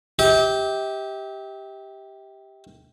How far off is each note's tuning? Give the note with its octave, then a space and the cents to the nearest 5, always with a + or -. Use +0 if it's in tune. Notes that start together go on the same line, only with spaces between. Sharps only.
G4 +0 E5 -40